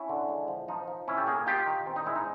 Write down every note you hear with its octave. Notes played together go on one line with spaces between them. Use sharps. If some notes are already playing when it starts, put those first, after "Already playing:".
Already playing: C#4 E4
D3
G#3
F3
F3 D#4
F3
C#4 E4
G4 A4
A#3 G#4 A#4
D#4 F4 G4
D#3
C4
D#4
G#3 E4
D#4